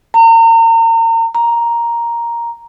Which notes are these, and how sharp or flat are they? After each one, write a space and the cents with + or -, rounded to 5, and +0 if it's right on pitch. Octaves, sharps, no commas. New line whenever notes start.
A#5 -35
A#5 +5